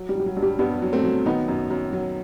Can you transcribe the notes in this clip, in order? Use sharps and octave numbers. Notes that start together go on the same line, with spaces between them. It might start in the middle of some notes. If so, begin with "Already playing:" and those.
Already playing: F#3
G3
F#3
G3
F#3
G2
G3
G2 G3 B3
F#3
A3 C4
F#3
D#3 B3 D#4
F#2
F#2
F#3